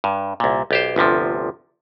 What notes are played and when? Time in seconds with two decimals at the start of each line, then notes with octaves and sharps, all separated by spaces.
0.04 G2
0.40 C2 A#2
0.71 B1 G4 C5
0.96 G1 D2 C3 F3